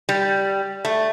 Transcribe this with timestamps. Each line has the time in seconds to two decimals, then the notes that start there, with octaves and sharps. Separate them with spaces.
0.09 G3
0.85 A3